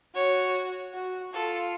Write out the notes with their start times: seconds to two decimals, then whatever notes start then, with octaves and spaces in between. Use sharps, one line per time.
0.15 F#4 C#5
0.94 F#4
1.33 F4 A4